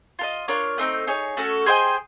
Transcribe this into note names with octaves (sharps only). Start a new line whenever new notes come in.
F4 A#4 D#5
D4 F4 A#4 C#5
A3 C4 D#4
D#4 G#4 C#5
A3 C#4 F#4 A4
G#4 C5 D#5 G5